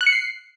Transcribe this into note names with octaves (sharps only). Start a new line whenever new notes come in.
F#6
C#7
C7